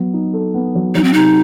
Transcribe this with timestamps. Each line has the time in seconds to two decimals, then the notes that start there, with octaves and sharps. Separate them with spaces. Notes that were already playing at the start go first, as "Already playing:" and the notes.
Already playing: F#3 B3
0.13 D#4
0.34 A4
0.54 B3
0.75 F#3
0.95 F#3 D#4
1.04 C4
1.13 C3 D#4